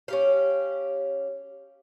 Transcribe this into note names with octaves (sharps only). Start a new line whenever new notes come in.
C#4 G4 F5